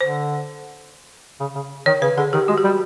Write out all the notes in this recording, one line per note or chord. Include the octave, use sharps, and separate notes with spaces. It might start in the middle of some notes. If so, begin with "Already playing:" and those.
D3 C5
C#3
C#3
D#3 C#5
C#3 B4
D3 G#4
D#3 G4
G#3 F#4
G4
G3
F#4